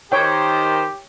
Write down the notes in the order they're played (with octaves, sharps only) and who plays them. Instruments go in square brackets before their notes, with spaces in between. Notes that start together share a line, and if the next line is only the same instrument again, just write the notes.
[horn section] D#3 C5 [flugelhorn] G4 [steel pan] C#5 G5